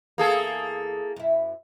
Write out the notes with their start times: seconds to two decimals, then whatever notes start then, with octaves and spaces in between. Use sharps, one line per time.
0.18 E2 A#3 G#4 A4
1.16 F#2 E4